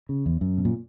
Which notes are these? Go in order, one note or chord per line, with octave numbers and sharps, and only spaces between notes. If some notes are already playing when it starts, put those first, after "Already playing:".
C#3
E2
F#2
B2
A#2